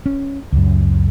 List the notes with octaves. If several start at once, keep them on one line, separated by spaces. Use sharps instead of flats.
C#4
C#2 F#2